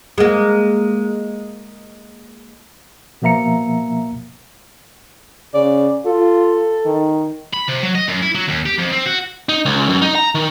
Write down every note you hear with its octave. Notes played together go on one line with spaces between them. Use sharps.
G#3 A#3
B2 F3 A#3 E5 A#5 C#7
C#3 D5
F4 A4
D#3
B5
C3
F#3
D#5
F#2
E4
F#3
D#2
G4
F2
C4
F#4
D#4
C#2
F#2
D#4
A#5
D#3